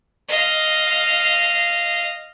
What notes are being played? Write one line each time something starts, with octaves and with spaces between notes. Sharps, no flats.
D#5 F5